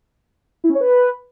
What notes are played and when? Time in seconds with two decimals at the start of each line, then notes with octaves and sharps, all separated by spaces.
0.64 E4
0.69 C#4
0.75 C#5
0.80 B4